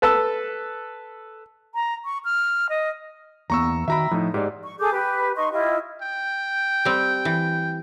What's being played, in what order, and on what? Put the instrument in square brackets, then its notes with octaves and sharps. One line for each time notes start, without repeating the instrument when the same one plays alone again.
[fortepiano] A4 B4 A5 E6
[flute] A#5
C#6
F6
D#5
[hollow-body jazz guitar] E2 A#3 B3 [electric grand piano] A#5 C#6 E6
[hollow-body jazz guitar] D#3 F#4 G5 [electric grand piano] E5 A#5 B5
[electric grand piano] A2 D#4 [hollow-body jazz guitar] F3
[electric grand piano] G#2 [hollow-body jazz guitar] G4 G#4 D5
[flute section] C#6
G#4 A4 D6 G6
G4 B4
D#4 D#5 C6 C#6
E4 F4 G4 D#5
[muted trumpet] G5
[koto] G3 C4
E3